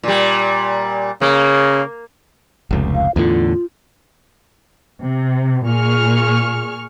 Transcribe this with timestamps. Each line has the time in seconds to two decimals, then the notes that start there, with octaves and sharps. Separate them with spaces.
0.03 A#2 G3
1.21 C#3 A#3
2.71 F1 C#2
2.95 F5
3.16 E2 A2 D3 F4
5.01 C3
5.66 A#2 G#4 C#6 F6